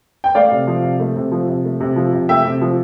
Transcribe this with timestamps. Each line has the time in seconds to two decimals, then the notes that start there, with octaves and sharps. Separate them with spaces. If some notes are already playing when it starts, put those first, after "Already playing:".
0.24 G5
0.35 A3 D5 F5
0.52 C3
0.67 F3
0.84 C3
1.00 A3
1.16 C3
1.32 F3
1.48 C3
1.65 A3
1.80 C3
1.96 F3
2.13 C3
2.29 A3 E5 G5
2.45 C3
2.61 F3